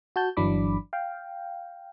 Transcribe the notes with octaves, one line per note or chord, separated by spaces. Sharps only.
F#4 A5 G6
G1 E3 F#3 D4 B5 D6
F5 G5